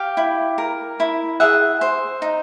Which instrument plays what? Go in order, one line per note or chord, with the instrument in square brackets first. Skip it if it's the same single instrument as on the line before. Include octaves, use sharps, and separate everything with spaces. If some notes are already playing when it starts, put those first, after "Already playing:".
Already playing: [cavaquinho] G4 F5 G5
E4
A#4
E4
G#4 E5 F#5
C5
D#4